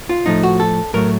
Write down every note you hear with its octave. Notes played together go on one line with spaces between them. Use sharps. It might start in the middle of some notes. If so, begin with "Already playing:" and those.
F4
A2 F3 A3 D#4
F#4
A4
A2 F#3 A3 A#4